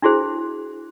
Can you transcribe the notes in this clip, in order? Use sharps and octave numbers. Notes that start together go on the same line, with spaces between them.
D4 E4 F#4 G#4 C5